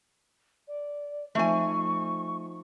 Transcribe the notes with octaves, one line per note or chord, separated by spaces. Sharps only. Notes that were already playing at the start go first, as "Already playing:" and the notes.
D5
F3 A3 C4 D#4 G#5 C#6